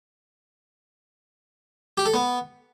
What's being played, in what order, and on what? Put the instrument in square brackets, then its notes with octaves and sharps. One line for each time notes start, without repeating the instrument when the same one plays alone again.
[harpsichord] G4
A4
B3